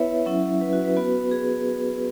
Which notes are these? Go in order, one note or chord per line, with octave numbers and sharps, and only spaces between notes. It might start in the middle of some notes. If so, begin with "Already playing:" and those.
Already playing: B3 E4 B4 C#5 E5
F#3 C#4 E4
B4
F#4
B4
B3 F#4
G#4